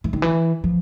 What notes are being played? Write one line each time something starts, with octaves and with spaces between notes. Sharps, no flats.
E3
D#3
E3
F3